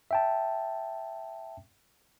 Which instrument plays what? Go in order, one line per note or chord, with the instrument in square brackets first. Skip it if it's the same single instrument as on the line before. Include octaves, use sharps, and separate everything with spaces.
[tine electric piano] E5 G5 A5